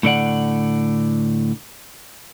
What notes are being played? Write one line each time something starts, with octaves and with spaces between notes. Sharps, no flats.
A2 D3 D5 F#5